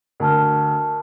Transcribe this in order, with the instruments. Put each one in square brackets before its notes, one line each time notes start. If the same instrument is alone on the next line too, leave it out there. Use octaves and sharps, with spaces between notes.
[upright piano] D2 [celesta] A#4 A5 F6